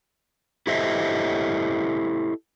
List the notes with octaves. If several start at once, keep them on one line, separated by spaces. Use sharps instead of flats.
E4 G4 A4 C5 D#5 E5